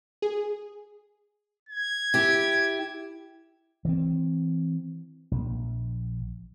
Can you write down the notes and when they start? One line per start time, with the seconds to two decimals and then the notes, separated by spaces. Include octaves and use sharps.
0.22 G#4
1.69 G#6
2.14 E4 G4
3.85 E3 C4
5.31 A#1